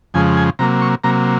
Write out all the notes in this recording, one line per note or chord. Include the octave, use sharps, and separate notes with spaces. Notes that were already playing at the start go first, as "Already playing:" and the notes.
F2 C#3 F3 G#3 G#5
G#5
C3 F#3 A#3 A#5
C#6
C3 F#3 A#3 A#5